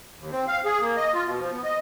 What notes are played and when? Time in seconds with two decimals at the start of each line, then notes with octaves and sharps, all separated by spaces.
0.18 D#2
0.32 C4
0.48 F5
0.65 G#4
0.81 A#3
0.97 D#5
1.14 F4
1.25 B2
1.40 F3
1.51 B3
1.64 D#5